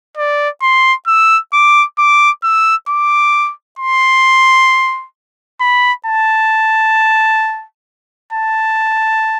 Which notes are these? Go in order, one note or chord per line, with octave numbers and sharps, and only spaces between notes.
D5
C6
E6
D6
D6
E6
D6
C6
B5
A5
A5